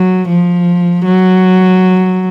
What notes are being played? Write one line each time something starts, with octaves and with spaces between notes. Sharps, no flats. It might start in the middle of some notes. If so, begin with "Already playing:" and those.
Already playing: F#3
F3
F#3